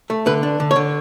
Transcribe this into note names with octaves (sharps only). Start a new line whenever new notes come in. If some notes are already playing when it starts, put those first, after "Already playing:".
A3
D3 B4
D4
D3
C#5
D3